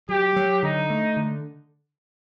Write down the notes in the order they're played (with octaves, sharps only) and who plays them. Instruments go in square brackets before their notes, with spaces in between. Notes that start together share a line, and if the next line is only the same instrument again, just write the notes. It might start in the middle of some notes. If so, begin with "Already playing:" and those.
[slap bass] F#3 [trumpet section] G4
[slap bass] F#3
[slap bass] D3 [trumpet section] D#4
[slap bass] A3
D3